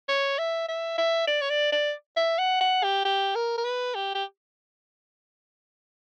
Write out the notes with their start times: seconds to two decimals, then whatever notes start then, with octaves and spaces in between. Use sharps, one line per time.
0.09 C#5
0.38 E5
0.68 E5
0.98 E5
1.27 D5
1.41 C#5
1.50 D5
1.72 D5
2.17 E5
2.38 F#5
2.61 F#5
2.83 G4
3.05 G4
3.35 A#4
3.58 A#4
3.64 B4
3.94 G4
4.15 G4